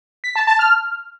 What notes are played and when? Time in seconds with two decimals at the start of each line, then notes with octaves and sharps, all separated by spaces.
0.24 B6
0.36 A5
0.47 A5
0.59 F6